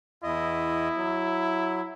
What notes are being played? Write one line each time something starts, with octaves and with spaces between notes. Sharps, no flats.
E2 E4 D#5
F#3